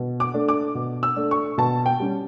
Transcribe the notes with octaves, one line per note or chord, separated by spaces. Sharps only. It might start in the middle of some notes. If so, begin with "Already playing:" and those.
Already playing: B2
D6
A3 D4
D6
B2
E6
A3 D4
C#6
B2 A5
G5
G3 C#4